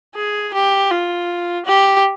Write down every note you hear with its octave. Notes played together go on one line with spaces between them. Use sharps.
G#4
G4
F4
G4